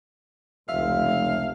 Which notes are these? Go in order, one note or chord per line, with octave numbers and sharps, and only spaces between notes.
F1 C#2 E5 F5